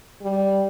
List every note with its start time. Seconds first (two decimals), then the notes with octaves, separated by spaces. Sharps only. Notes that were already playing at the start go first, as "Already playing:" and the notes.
0.22 G3